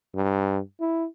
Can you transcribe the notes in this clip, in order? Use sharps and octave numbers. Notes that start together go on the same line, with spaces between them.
G2
E4